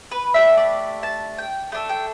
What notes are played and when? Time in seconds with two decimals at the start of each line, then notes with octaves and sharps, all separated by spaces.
0.11 B4
0.34 A3 D4 G4 E5
0.58 D5
1.03 A5
1.38 G5
1.72 A3 D4 A4
1.89 G5